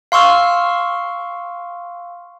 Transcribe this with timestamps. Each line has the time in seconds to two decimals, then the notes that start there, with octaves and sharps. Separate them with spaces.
0.12 F5 C6 C#6 E6 F6